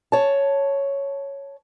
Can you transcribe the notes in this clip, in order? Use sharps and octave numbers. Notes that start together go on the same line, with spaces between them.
C#5 A5